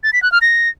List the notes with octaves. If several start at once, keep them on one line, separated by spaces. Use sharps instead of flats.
A6
B6
F#6
F6
A#6